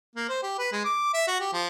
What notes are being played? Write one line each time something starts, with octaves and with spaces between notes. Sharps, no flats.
A#3
C5
G4
B4
G#3
D6
E5
F#4
G4
F3